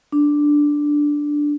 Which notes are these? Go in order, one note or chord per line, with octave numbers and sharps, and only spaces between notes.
D4